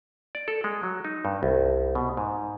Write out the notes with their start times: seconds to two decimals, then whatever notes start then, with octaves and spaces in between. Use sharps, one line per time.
0.35 D5
0.48 A4
0.64 G#3
0.83 F#3
1.05 D#4
1.25 G2
1.43 C2
1.95 B2
2.17 G#2